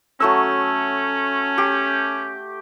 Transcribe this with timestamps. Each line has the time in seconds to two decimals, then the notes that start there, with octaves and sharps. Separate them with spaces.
0.20 F#3 A3 C#4 E6
1.58 G4